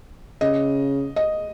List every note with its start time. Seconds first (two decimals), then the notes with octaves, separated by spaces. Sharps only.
0.41 C#3 D#5
1.16 D#5